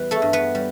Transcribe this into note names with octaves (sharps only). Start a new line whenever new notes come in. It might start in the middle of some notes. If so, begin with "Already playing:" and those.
Already playing: E2 G3 B4
A3 A4
G2
B3 B4
G3